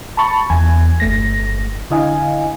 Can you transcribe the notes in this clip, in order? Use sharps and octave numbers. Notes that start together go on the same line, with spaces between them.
A5 B5 C#6 A6
E2 G#5 G#6
G1 A3 A#6
D3 E4 D#5 F5 G#5